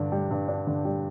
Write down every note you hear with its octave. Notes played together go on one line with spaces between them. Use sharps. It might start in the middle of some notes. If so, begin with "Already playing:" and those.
Already playing: G2 D3 D4
G3
G2
D4
D3
G3